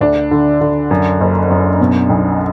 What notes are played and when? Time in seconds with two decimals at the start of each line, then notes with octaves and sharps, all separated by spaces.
0.01 D2 D4
0.31 D3
0.61 D3
0.91 F#2
1.20 F#1
1.50 F#2
1.81 B2
2.10 B1